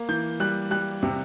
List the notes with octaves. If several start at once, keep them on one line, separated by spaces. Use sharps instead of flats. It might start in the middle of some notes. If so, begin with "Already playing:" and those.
Already playing: A#3
E3 G6
G3 F#6
G3 F#6
C3